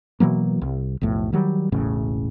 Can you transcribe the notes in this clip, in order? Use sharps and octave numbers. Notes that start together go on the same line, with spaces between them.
B2 E3 F#3 A#3
C2
B1 F2 A2
D#3 F#3 G3
E1 A1 A2 C#3